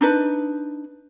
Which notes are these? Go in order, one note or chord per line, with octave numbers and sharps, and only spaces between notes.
D4 D#4 B4